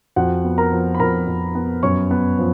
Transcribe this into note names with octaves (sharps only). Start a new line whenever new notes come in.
F2 F#4 F#5
B3
A#4 A#5
F3
B5
F2 A#4 A#5
F2
B3
F#2 C#5 C#6
B3
F3